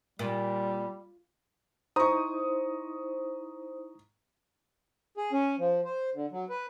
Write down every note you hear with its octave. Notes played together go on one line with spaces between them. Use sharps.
A#2 G3
D#4 E4 C5 A#5 C#6 D#6
G#4
C#4
F3
C5
D3
F#3
B4